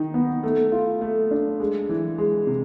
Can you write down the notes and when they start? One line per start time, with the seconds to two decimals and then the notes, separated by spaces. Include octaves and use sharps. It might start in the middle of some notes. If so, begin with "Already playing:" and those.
Already playing: D#3 D#4
0.14 B3
0.43 A3
0.72 F4
1.01 A3
1.31 D4
1.60 G#3
1.89 E3
2.18 G#3
2.47 C3